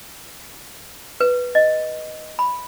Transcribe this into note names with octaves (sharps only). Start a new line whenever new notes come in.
B4
D#5
B5